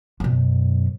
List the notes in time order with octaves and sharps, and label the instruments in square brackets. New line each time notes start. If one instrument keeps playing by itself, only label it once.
[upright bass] F#2 B2